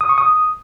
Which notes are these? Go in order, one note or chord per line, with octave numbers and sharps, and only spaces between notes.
D#6
C#6
D#6